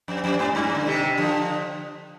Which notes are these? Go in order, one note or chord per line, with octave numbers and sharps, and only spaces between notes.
F2
F2
G#2
G2
D3
C3 D#3
D3 F3